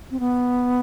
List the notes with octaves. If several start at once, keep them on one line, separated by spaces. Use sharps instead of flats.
C4
B3